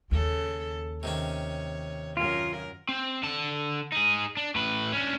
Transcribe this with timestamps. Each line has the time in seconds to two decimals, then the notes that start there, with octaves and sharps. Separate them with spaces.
0.11 D#2 C#3 A4
1.03 C3 D#3 C#4 C#5
2.17 F#2 F4 A#4
2.89 C4
3.23 D3 A5
3.92 D#4 G#4
4.37 D4
4.55 A2 B4
4.92 C#4 D4